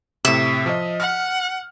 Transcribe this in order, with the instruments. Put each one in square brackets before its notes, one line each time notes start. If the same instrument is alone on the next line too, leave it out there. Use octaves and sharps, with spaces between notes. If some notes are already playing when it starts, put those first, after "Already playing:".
[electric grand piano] A2 C3 [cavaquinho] E5
[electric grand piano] F3 D#5
[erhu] F#5 [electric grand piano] F6